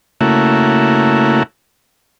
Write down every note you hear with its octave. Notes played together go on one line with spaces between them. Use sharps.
C#3 A3 A#3 E4 F#4